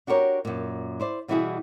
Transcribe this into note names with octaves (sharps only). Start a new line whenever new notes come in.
D4 F#4 G4 A#4 C#5
F#2 A#2
E4 C5 D5
B2 E3 G3 E4 F#4 G#4